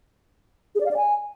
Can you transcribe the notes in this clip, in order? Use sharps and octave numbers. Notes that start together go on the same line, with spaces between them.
G#4
D5
F5
D5
G#5